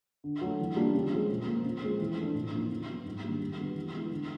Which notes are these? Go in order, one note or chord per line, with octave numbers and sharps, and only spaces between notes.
D3
F#3 A3
E3
G3 A#3 D4 F4
C#3
F3 G#3
A#2
F3 A#3
C#3
F3 G#3 C4
E3
A3 D4
A2
F3 A#3 D#4
C#3
F#3 B3
G#2
D#3 G3 A#3 D4
G2
D3 G3 B3
E3
G#3 B3 E4
D3